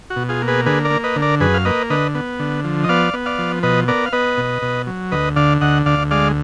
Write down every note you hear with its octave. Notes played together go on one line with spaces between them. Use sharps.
F#4
B2
F4 G#4
A#3
G#4 B4
D3 G#4 B4
A#4 D5
A#3
B4 D#5
D3
A#4 D5
F#2 G#4 B4
F5
A#3 B4 D#5
D3 B4 D#5
B3
D3
F3
D#5
B3 D5 F5
B3
D5 F5
F3
B2 B4 D#5
B3 A#4 D5
F5
B3 B4 D#5
B2
B2
F#3
D2 B4 D#5
D3 D5 F5
D2 D#5 F#5
D2 D5 F5
G#3 D5 F5